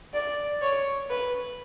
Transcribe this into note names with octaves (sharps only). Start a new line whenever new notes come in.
D5
C#5
B4